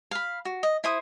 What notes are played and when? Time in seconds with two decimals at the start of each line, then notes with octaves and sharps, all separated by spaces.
0.11 F5 B5
0.45 F#4
0.63 D#5
0.84 E4 C5 D#6